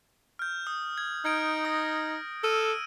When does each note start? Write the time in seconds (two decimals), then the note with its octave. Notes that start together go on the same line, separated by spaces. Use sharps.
0.39 F6 G6
0.67 D#6
0.98 G#6
1.25 D#4 F6 G#6 D7
1.65 D#6 A#6
2.44 A4 E6 F6 D#7